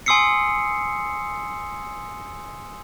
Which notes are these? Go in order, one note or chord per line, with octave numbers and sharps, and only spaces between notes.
G#5 C6 D#6 E6 C7 C#7